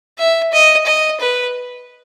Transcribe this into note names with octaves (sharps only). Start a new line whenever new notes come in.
E5
D#5
D#5
B4